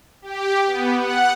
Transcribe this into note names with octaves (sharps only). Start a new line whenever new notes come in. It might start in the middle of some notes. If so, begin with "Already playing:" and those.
G4
B3
F#5